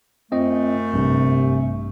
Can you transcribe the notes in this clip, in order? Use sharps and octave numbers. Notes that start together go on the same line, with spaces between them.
F#2 A3 C4 F4 D#5
A#1 G2 C3